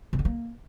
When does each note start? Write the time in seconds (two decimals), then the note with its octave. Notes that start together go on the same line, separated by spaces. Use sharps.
0.13 C3
0.19 D3
0.25 A#3